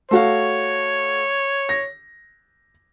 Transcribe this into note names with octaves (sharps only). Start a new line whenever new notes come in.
A3 F#4 C#5 F5
A#6